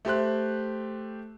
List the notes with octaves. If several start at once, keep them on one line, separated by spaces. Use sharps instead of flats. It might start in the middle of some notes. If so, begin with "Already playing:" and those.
A3 G4 C5 F#6